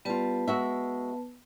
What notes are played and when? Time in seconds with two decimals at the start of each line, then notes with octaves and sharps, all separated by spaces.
0.05 G3 B3 F4 B4 A5
0.48 G#3 F#4 E5